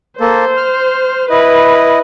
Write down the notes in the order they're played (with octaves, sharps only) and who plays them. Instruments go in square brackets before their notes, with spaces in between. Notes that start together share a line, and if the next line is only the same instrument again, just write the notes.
[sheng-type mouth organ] A#3 A4 [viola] C5
[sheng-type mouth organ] F6
[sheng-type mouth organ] E4 D#5 [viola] B4